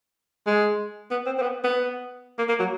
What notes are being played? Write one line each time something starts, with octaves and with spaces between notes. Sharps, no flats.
G#3
B3
C4
C4
B3
B3
A#3
A#3
F#3